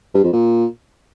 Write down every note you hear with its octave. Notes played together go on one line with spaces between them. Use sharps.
G2
F2
A#2